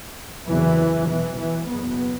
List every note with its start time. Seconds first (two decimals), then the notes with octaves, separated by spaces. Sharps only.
0.48 F#1 E2 C3 E3
1.08 B1 B2 E3
1.38 E3
1.68 F#1 E2 B2 B3